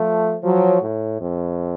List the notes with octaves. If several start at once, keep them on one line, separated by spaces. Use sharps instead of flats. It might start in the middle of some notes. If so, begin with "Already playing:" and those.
Already playing: F3 A3
F3 F#3
A2
F2